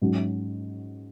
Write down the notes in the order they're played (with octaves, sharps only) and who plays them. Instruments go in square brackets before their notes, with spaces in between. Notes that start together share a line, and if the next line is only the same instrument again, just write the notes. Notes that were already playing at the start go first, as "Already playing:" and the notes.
[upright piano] G#2 F#3 C#4 F#4